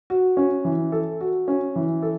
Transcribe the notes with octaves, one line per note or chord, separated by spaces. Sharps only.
F#4
C#4
E3
A4
F#4
C#4
E3
A4